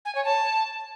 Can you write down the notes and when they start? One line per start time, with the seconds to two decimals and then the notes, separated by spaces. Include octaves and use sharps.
0.05 G#5
0.15 C#5
0.25 A5